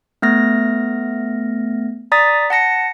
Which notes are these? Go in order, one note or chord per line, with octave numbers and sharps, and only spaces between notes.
A3 B3 F6 A#6
D5 A#5 D#6 A6 B6
F#5 A5 A#6 C#7